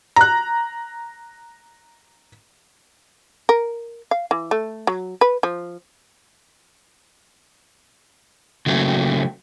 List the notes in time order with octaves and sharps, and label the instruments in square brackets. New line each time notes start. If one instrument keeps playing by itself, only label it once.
[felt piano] A#5 F#6
[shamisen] A#4
F5
E3
A3
F#3
B4
F3
[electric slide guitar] C#3 F#3 A3 A#3